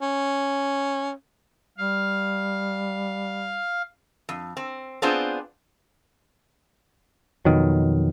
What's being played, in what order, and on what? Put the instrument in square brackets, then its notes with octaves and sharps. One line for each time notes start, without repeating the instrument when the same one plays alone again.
[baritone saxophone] C#4
[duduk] G3 [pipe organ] F5
[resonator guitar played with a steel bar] F2
C4
B3 C4 D4 F4 G#4 C5
[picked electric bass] F2 B2 D#3 F#3